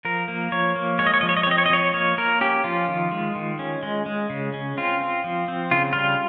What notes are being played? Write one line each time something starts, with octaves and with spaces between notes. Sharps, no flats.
F3 A#4
A#3
F3 C#5
A#3
G#3 C#5
D#5
C#5
F3 D#5
C#5
D#5
C#5
C4 D#5
C#5
D#5
F3 C#5
A#3 C#5
A#3 A#4
C#4 G4
F3 F4
D#3
G#3
D#3
C#4
G#3
G#3
C#3
C#4
C4 F4
C4
F3
C4
C#3 F4
G3 F4